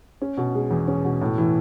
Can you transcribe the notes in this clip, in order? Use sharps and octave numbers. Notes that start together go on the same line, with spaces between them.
C#4
B2
G#3
E2
C#4
B2
A2
E3